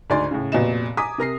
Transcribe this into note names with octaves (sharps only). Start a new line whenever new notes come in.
D2 G#2 D5 G#5 C6
A2 C#3
F1 A#2 B3 F#4 D#5 E7
G#5 A#5 D6 D#6 B6
C3 A#4 A#6 C7